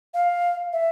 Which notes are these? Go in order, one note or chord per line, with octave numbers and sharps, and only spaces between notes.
F5
E5